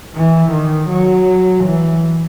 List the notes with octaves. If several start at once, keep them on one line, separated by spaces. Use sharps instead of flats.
E3
D#3
F#3
E3